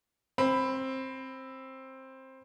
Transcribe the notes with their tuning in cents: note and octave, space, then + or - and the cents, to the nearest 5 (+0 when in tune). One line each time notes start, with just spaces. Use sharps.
C4 +15 B5 +15